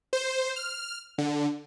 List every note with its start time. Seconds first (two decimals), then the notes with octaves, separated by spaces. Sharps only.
0.13 C5
0.56 F6
1.18 D3